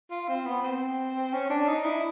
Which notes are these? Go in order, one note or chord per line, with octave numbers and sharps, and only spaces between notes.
F4
C4
B3
C4
C#4
D4
D#4
E4